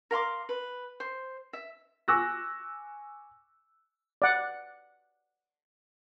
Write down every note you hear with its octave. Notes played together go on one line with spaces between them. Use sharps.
A#4 F5 C6 D6
B4
C5
E5
G#5 C#6 D6 E6 F#6 A#6
D5 F#5